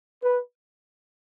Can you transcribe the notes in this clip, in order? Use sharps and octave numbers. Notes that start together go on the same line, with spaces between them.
B4